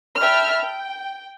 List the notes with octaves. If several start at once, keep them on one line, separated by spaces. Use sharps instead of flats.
E5 G5 A5 B5 F6
G5